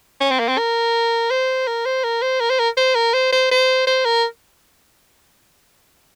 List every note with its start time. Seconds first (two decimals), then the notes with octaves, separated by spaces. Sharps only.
0.20 C#4
0.31 C4
0.39 A#3
0.48 C4
0.58 A#4
1.30 C5
1.67 A#4
1.85 C5
2.04 A#4
2.22 C5
2.40 A#4
2.50 C5
2.59 A#4
2.77 C5
2.95 A#4
3.14 C5
3.32 C5
3.51 C5
3.87 C5
4.05 A#4